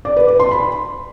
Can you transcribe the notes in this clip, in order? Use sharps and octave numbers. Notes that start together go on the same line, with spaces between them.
D5
B4
B4
C6
B5